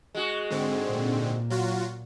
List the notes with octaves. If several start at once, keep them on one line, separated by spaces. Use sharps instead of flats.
G#3 F#4
G#2 D3 C4
A#2
F#3 F4 F#4